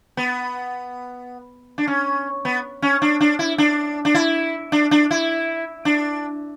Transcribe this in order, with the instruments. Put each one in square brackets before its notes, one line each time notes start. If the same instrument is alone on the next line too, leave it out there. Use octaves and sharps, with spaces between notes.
[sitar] B3
D4
C#4
B3
C#4
D4
D4
E4
D4
D4
E4
D4
D4
E4
D4